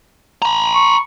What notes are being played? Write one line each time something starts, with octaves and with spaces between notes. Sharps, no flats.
A#5 B5
C#6